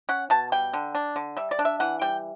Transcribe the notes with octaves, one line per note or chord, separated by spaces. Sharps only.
C#4 F#5
B2 A5
G3 G5
D3
D4
D3
G3 E5
D5
D4
E5
E3 F#5
G3 G5